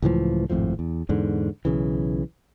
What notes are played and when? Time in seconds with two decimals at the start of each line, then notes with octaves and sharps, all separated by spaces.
0.02 C#2 A2 E3 F3
0.50 G#1 F2 A2 F3
0.79 E2
1.09 E2 G#2 D3
1.65 B1 C#3 E3